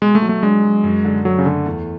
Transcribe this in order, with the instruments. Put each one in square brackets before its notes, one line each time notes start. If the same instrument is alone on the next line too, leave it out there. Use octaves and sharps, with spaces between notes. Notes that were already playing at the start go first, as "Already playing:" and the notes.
[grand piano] B2 [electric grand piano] G#3
[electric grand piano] A3
[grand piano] F#3
[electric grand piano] A3
[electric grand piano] G#3 [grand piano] D4
[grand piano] F#3
F#2
D3
[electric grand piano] F#3 [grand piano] A3
[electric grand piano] C#3
[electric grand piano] D3 [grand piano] A3
[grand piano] E2